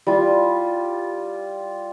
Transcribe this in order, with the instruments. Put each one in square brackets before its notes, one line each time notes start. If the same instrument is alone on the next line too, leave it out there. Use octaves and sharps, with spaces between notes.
[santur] G3 F4